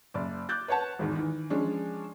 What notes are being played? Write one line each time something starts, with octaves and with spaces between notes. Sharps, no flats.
F#1 D5
D6 F#6 G6 A6
B4 C#5 F#5 A5
G#1 E2 D#3
D#3 E3
F3 G#3 C#4 D4